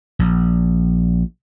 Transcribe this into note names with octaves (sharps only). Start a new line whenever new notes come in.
A#1